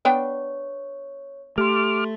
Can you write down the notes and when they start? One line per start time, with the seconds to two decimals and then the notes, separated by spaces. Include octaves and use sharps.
0.05 B3 D4 C#5 G5
1.58 A3 G4 C6 D6 F6